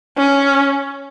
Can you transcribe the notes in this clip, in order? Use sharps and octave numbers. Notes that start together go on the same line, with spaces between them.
C#4